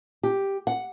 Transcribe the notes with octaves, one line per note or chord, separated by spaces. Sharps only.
G4
F#5